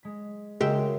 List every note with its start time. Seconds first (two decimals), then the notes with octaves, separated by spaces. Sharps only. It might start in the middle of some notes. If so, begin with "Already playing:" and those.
0.03 G#3 B6
0.60 C#3 G#3 A#3 F#4 E5 G5